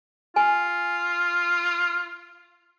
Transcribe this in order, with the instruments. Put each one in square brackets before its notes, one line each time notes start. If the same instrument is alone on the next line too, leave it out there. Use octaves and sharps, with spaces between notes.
[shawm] F4 [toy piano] G#5